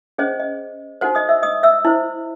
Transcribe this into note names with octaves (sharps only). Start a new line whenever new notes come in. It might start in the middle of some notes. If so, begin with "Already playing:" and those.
C#4 G#4 C5 D#5
D#5
D#4 F#4 A4 C5 F#5
D#5 D#6
E5 E6
D#5 D#6
E5 E6
E4 C5